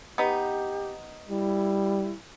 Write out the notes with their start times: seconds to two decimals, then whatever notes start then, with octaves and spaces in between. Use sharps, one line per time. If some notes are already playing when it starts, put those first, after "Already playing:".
0.18 B3 D#4 G4
1.29 G3 E4